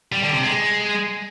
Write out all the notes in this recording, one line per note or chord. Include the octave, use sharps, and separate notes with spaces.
G3
D3
C3
G#3